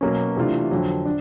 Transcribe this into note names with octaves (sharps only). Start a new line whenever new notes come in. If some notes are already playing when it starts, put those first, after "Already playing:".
B2 F#3 A#3 C#4
C3 E3 A3 D4 F4
F2 D3 F#3
D4